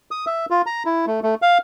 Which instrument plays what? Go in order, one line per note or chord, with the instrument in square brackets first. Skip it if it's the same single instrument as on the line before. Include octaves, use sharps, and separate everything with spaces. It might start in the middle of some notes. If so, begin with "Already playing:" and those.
[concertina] D#6
E5
F4
A#5
E4
A3
A3
F5